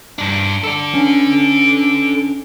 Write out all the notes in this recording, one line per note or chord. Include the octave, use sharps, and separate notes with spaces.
G2 D4 A5
A4 D5
B3 C#4 D4